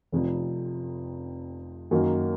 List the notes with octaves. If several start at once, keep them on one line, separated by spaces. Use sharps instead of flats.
F1 F2 C3
F#2 D#3 F#3 A#3